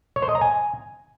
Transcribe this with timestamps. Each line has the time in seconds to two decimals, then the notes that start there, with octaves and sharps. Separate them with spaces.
0.16 C#5
0.22 C5
0.29 D#5
0.35 A#5
0.41 G#5